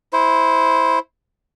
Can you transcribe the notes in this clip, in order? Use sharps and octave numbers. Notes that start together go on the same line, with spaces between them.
E4 C5